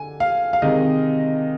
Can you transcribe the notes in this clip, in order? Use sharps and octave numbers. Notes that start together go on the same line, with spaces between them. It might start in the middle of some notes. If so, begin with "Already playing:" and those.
Already playing: D3 G#5
F5
F5
C3 D#3 G#3 D#5